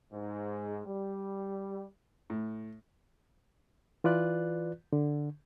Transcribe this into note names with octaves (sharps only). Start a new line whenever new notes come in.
G#2
G3
A2
E3 F4 B4 D5 F#6
D3